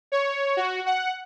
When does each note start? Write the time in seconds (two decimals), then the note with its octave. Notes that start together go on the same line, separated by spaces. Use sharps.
0.12 C#5
0.57 F#4
0.86 F#5